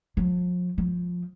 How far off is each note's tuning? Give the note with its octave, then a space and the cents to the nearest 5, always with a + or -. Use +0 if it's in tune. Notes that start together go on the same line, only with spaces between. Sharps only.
F3 +40
F3 +15